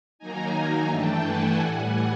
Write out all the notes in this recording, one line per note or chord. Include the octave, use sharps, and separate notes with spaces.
D#3 F#3 A#3 D#4 G#5 A#5
G2 E3 A3 D4 G5 A5
F#5 G#5
A2 E3 G3 F#5 G#5